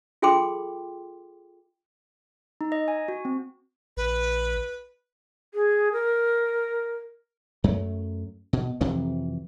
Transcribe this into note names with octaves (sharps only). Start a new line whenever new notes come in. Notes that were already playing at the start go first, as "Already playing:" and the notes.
F4 G#4 A4 G5 C6 D6
D#4
D#5
G#5
F#4
C4
A#1 B4
G#4
A#4
F#2 F#3 A3
B2
F2 C3 E3 F#3